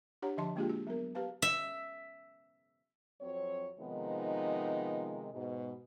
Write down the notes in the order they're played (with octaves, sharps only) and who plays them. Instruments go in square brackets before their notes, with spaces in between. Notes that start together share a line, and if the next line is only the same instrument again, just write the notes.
[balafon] D4 G4 C#5 F#5 A#5
D3 F3 D#5 A5 C6
G#3 A#3 D4 F4 G4 G#4
F#4
F#3 B3 A#4
G4 B4 F5 A5
[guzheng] E5
[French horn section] F2 F#3 C4 C#5
C3 D#3 F3 G#3 B3 D#4
G#2 B2